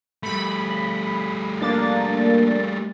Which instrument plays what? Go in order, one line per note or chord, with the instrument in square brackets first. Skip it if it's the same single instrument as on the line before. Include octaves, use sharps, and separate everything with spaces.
[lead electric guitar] G3 A3 [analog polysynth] B5
[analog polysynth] A#3 D4 A6